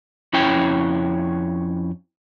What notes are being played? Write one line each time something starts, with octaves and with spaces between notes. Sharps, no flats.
F2 C#4 E4 C#5 G5